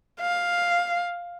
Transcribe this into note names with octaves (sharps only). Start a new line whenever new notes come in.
F5